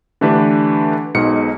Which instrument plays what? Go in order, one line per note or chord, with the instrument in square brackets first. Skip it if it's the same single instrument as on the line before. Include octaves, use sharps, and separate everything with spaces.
[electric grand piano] D3 E3 A3 D4 G4 B4
B1 G#2 B2 C#7